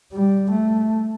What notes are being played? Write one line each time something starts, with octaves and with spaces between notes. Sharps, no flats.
G3
A3